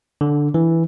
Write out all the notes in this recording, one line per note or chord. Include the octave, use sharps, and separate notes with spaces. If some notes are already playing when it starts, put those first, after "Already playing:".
D3
E3